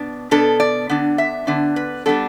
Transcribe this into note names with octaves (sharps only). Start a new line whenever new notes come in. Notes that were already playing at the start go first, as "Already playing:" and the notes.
Already playing: B2 B3 D4
B2 B3 D4 A4
D5
D3 B3 D4
E5
D3 B3 D4
B4
G3 B3 D4 A4